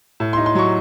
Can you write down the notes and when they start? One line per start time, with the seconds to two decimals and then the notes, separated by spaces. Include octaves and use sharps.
0.20 A2
0.33 C6
0.37 D#4
0.46 C6
0.55 F#3 C#6